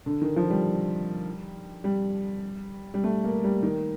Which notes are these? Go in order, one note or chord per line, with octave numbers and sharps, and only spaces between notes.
D3
D#3
F3
G3
G3
G3
A3
A#3
G3
D#3